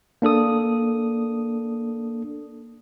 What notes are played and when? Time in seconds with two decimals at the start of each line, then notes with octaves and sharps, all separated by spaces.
0.22 A#3 D4 A4 D#6